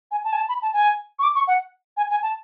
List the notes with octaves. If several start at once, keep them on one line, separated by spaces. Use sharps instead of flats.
G#5
A5
G#5
A5
B5
A5
G#5
C#6
D6
C#6
F#5
G#5
G#5
A5